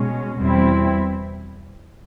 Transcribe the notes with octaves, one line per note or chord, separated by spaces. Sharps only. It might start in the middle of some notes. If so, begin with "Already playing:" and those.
Already playing: B2 G#3 C#4
E2 B2 G3 C4 E4